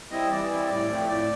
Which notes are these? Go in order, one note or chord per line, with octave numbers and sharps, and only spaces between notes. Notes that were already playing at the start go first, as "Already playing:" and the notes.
G3 C4 E4 D#5
E3 D5
G3 C4 E4
A2 D5
F3 A3 C4
A2 D5